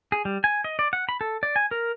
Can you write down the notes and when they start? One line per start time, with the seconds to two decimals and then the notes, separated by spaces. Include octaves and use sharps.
0.12 G#4
0.25 G3
0.44 G#5
0.64 D#5
0.79 D5
0.93 F#5
1.09 B5
1.21 A4
1.43 D5
1.56 G#5
1.71 A#4